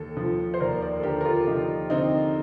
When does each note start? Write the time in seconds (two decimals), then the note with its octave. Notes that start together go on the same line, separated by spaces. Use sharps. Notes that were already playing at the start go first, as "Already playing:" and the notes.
Already playing: D#2 A4
0.17 F3
0.54 C5
0.60 D#2 A#4 D5
0.82 A#4 D5
1.00 A4
1.03 D3 G4 A#4
1.21 A#4
1.25 F4 A4
1.47 F3 D#4 G4
1.90 D3 C4 D#4